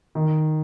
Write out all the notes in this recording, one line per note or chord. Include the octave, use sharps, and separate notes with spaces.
D#3